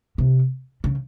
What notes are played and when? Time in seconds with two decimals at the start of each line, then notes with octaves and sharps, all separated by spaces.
0.18 C3
0.84 C#3